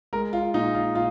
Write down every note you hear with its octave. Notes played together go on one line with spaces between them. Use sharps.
G#3 A#4
F4
A#2 D#4
F4
A#2 F4